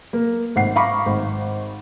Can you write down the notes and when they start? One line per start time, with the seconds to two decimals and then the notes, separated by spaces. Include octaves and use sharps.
0.13 A#3
0.56 G#1 F#5 C7
0.76 F5 A#5 B5 C#6 D6
1.06 G#1